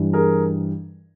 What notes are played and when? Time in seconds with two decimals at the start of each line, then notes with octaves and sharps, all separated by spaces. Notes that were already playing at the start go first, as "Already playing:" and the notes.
Already playing: G2 E3 G3
0.13 G#4 A#4